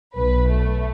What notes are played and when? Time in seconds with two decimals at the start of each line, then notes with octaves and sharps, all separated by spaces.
0.15 B1 B4
0.49 A3